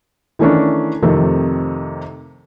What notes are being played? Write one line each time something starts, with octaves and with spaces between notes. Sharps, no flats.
D#3 E3 A3 C#4 D4
F2 C3 D#3 A3